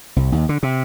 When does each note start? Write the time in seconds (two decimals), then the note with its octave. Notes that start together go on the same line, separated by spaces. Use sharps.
0.16 C2
0.32 D#2
0.49 D3
0.63 C3